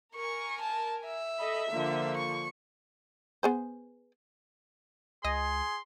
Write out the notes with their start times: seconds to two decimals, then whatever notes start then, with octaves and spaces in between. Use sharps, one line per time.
0.16 A#4 G#5 C#6
0.61 A5
1.06 E5
1.40 A4 D#5 B5
1.71 D3 F3 A#3
2.17 C#6
3.43 B3 G#4 C5
5.24 C#2 G#4 D#5 C6